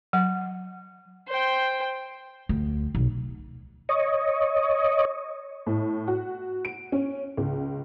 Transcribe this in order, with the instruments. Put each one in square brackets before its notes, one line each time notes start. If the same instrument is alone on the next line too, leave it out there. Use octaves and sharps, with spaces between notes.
[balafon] F#3 F#5
[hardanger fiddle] C5 G5
[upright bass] D2
B1
[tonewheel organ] C#5 D#5
[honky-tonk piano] A2
F#4
D7
C#4
C#2